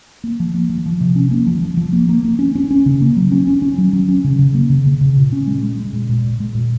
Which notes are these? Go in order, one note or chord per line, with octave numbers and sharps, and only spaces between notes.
A#3
F3
A#3
F3
F3
C3
C#4
A#3
F3
F3
F3
A#3
A#3
A#3
C#4
C#4
C#4
C#3
A#3
F#3
C#4
C#4
C#4
F#3
F#3
C#4
C#3
C#3
A#3
C#3
C#3
C#3
A#2
C#4
G#3
G#3
G#3
A#2
A#2
A#2
G#3
A#2